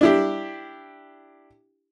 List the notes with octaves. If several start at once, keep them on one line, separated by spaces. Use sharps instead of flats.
D4 E4 G4